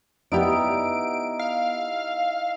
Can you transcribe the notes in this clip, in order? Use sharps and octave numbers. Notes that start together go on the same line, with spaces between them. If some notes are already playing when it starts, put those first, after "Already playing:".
B3 D#4 E4 G4 D5 F#5 D7
F5